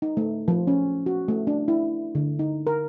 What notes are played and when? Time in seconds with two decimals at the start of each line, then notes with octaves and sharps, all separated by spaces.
0.02 D#4
0.17 A3
0.48 F3
0.67 C#4
1.06 F#4
1.28 A3
1.47 D4
1.68 E4
2.15 D3
2.39 D#4
2.67 A#4